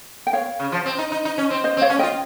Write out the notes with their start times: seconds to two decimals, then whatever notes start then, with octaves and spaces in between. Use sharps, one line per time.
0.27 G5
0.33 C#5 F5
0.59 C#3
0.72 F3
0.86 C4
0.98 D#4
1.12 D#4
1.25 D#4
1.38 C#4
1.50 C4
1.64 C5 D#5
1.77 C4
1.81 C#5 F5
1.90 C#4
1.99 F4 D#5 G5